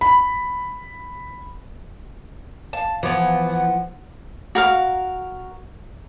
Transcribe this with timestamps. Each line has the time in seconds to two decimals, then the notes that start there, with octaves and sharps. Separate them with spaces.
0.01 B5
2.73 F5 A5
3.03 E3 F3 B3
3.49 F#5
4.55 F#4 A#4 F5